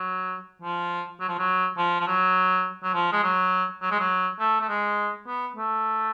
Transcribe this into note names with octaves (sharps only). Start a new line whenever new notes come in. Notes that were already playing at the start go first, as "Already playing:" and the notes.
Already playing: F#3
F3
F#3
F3
F#3
F3
F3
F#3
F#3
F3
G#3
F#3
F#3
G#3
F#3
A3
A3
G#3
B3
A3